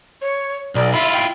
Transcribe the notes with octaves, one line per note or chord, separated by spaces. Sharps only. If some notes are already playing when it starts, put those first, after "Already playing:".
C#5
B1 D5
E4 F4 E5
G5